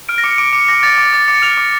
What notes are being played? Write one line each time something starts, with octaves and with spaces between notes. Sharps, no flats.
F6 D7
A#6
D6 C#7
D6 D7
D6 C#7
D6 A#6
D6 A6
D6
D6 A6
D6 C#7
F6 F7
D6